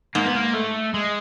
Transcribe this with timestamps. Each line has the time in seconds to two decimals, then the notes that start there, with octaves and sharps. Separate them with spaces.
0.15 G#2 A#3
0.25 B3
0.35 A#3
0.54 A3
0.94 G#3